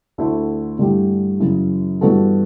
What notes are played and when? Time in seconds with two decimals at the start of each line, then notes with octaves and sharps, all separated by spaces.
0.18 D2 D3 A3 E4
0.79 G2 D3 A3 E4 G4
1.39 F#2 C#3 E3
2.01 G2 E3 B3 F#4 A4